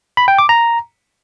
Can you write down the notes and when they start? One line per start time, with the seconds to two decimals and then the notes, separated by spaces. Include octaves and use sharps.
0.17 B5
0.28 G5
0.39 D6
0.49 A#5